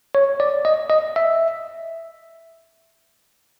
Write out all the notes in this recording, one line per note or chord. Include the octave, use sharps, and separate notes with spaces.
C#5
D5
D#5
D#5
E5